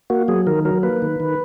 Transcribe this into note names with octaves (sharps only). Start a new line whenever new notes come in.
A#3 F#4
F#3 G#4
D#3 A#4
F#3 A#4
A#3 B4
D#3
D#3